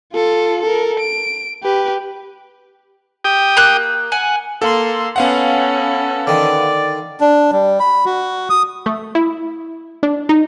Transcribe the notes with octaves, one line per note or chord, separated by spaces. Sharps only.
F4 A4
A4 A#4
D7
G4 B4
G4 G5 D#6
A#3 F#6
F#5 G#5
A#3 A4 C6
B3 C#4 A4 F5 F#5
D3 D#3 D5
D4
G3
B5
F#4
D#6
A3
E4
D4
D#4